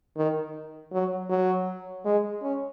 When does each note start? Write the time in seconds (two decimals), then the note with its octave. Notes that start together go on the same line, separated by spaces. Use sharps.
0.17 D#3
0.93 F#3
1.30 F#3
2.06 G#3
2.42 C#4